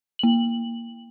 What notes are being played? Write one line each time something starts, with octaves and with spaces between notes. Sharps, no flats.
A#3 F#7